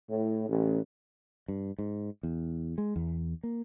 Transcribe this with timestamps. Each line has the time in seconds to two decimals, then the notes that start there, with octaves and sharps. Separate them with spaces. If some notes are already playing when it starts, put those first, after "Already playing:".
0.10 A2
0.48 A1
1.48 G2
1.79 G#2
2.23 E2
2.78 G#3
2.96 E2
3.43 A#3